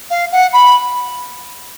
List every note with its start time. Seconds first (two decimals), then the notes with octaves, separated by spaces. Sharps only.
0.10 F5
0.32 F#5
0.53 B5